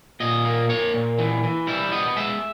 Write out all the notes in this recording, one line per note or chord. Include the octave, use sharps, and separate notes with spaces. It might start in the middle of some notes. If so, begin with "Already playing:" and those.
A#2 D#5
A#3
A#3 C#5
A#2
E3
E3
G3 E4
B3 D#5
G#3 E5